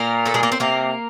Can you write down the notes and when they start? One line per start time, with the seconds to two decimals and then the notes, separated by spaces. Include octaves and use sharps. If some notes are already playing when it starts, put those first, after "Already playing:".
Already playing: A#2 A#3 A#4
0.26 A3 A4
0.34 G#3 G#4
0.43 A#3 A#4
0.52 C4 C5
0.60 C3 A#3 A#4